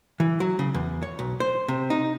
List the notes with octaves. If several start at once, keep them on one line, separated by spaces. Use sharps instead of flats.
E3
F#3
C#3
E2
C#5
B1
C5
C3
D#4